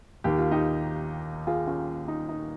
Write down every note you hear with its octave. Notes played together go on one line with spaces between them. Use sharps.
D#2 D#3 G4
F4
D#4 G4
F4 G#4
C#4 F4
D#4
D#4